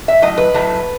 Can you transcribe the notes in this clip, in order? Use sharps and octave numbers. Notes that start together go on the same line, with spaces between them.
E5
A2 F#3 D#5
B4
A2 F#3 A3